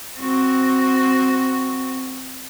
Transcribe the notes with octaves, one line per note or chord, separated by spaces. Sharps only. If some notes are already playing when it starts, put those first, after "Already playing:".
C4 F#4